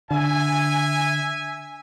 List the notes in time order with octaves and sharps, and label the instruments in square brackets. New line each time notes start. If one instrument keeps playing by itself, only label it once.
[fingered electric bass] D3 [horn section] E5 G#5